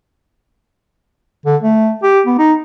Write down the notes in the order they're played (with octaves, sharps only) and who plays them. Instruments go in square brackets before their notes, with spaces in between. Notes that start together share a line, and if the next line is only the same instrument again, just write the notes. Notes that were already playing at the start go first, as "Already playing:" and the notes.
[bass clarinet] D3
A3
G4
B3
D#4